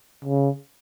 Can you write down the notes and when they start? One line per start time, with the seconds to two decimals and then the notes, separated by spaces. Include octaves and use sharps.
0.25 C#3